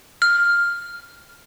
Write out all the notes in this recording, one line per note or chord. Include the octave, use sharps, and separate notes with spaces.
F6